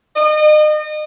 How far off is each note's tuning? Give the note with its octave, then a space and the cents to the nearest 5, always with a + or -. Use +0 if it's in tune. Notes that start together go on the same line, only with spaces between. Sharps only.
D#5 -35